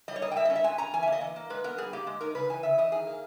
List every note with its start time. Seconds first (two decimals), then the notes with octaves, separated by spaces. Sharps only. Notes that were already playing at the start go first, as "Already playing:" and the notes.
0.08 G3 D#5
0.16 C#5
0.22 A#3 D#5
0.31 G5
0.36 G3 E5
0.45 C#4 D#5
0.56 E5
0.64 G#3 G#5
0.78 C#4 A#5
0.93 E3 G#5
1.03 E5
1.07 A#3 D#5
1.21 E3
1.36 A#3
1.50 G#3 B4
1.64 B3 A#4
1.78 G3 G#4
1.93 A#3 G4
2.07 G#3
2.21 D#4 A#4
2.35 C#3 B4
2.50 E3 G#5
2.63 C#3 E5
2.78 E3 D#5
2.91 D#3 G#4
3.07 A#3